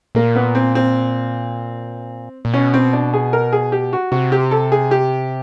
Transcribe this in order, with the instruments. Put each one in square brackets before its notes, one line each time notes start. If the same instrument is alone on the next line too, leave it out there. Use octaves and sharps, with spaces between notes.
[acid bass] A#2 [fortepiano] A#3
[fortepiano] B3
C4
C4
[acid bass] A#2
[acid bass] B2 [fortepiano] C#4
[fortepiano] C4
D4
G#4
A#4
G#4
G4
F#4
[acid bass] C3 [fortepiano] F#4
[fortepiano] G4
A4
G#4
G4